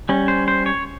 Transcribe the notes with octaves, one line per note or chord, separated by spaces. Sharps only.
G3 C#4
C5
C5
C#5